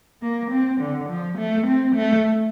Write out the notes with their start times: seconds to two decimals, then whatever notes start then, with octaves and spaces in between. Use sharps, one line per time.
0.22 A#3
0.51 C4
0.81 D3
1.09 F3
1.38 A3
1.67 C4
1.95 A3